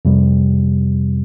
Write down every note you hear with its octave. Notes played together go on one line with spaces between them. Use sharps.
F2 C3 G3